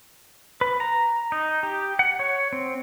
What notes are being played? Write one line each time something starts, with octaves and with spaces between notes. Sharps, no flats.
B4
A#5
D#4
G4
F#5
C#5
C4